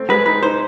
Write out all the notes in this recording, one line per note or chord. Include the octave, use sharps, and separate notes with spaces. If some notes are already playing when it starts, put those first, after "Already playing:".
Already playing: A3 C4
G#3 B4
D#4 B4
D#4 C5